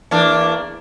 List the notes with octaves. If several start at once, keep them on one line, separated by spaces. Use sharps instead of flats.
E2 A#3 D4